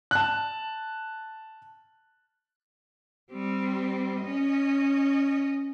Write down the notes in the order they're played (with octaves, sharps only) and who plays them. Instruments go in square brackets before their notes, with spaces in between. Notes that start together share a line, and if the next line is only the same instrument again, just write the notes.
[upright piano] A5 F#6
[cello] G3 C4
C#4 D#5